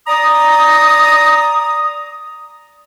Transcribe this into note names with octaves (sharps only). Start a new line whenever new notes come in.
D5 A#5 D#6